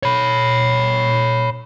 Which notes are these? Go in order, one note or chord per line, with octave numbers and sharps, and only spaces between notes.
C#5 B5